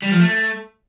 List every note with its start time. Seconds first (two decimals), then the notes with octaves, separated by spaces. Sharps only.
0.02 G3
0.11 F3
0.20 A3